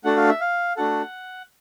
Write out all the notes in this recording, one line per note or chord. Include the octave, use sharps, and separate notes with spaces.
A3 D4 F#4 A4 F#5
F5
E5
F5
A3 D4 F#4 A4 F#5